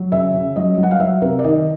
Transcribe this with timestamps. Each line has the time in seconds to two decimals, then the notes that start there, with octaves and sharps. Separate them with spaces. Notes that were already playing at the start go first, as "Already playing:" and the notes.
Already playing: F#3
0.12 C#3 E5
0.34 C#3
0.56 F#3 D#5
0.78 F#3
0.83 F#5
0.91 F5
1.00 F#3 E5
1.22 C3 A#4
1.39 D5
1.44 D#3 D#5